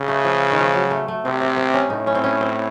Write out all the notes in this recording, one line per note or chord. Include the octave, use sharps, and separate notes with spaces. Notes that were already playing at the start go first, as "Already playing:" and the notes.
Already playing: C#3
A3
F3
D#3
F3
F#3
A3
A3
C3 C4
C4
C4
C#4
A2 D#4
C#4
C4
C#4
C4